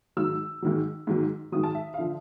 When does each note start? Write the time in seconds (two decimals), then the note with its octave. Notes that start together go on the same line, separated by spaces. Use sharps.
0.17 G#2 D#3 F#3 E6
0.62 G#2 D#3 F#3
1.07 G#2 D#3 F#3
1.52 G#2 D#3 F#3 D#6
1.64 A5
1.75 E5
1.94 F5
1.98 D3 F3 E5